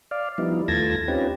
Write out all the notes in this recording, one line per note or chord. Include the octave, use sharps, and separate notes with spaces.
D5 F5
F3 G3 B3 D#4 E4
D#2 A3 F4 A5 G#6 A#6
C4 C#4 D#4 F4 G4 B4